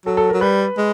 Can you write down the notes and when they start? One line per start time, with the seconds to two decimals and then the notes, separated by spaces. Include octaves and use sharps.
0.06 F#3 A4
0.17 A4
0.29 F#3 A#4
0.41 G3 B4
0.78 G#3